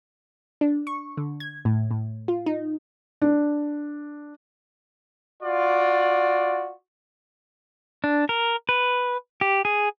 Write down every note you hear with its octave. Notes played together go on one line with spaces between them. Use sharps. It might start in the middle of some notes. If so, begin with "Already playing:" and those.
D4
C#6
D3
G#6
A2
A2
F4
D#4
D4
F4 F#4 D5
D4
A#4
B4
G4
G#4